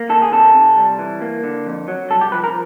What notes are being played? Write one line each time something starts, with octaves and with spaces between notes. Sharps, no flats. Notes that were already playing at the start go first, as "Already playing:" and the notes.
Already playing: A#3
D#3 A4
G#4
C3 A4
C3
G3
E3
A#3
D3
F2
F#3
C2 A4
G4
F3 B4
A#4